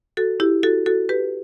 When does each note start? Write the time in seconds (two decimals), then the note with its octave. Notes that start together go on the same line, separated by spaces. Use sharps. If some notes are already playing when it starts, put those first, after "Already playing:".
0.17 F#4 A4
0.40 E4 G4
0.63 F#4 A4
0.86 F#4 A4
1.09 G4 B4